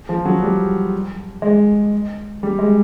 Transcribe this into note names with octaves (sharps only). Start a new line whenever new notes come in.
F3
F#3
G3
G#3
G3
G#3